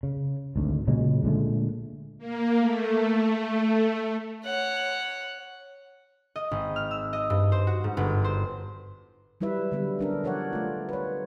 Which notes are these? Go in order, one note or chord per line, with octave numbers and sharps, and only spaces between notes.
C#3
G#1 D2
A#2 C#3 F#3 G#3
A#2 D3 G#3 A3
A#3
A3
C#5 F#5
D#5
G#1
F6
E6
D#5
G2
C5
F#4
G#2
G1
C5
F#3 G3 E4 B4 E5
D3 F#3 G3 B3
C#4 D4 A#4
F3 A#4 C#5 D5 F#5
A3 F4
B4 C#5